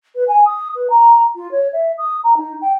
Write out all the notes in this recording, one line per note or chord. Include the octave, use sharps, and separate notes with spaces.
B4
G#5
D#6
B4
A#5
F4
C#5
E5
D#6
A#5
D#4
G5